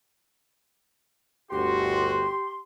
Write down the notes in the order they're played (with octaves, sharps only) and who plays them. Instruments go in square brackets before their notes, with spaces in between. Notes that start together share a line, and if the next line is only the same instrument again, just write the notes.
[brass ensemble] G1 D2 F#4 [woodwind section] G4 C6